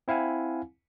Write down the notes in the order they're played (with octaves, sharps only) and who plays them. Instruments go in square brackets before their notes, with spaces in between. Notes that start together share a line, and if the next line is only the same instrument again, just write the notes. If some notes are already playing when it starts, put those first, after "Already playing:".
[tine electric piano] C4 E4 F5 F#5 G#5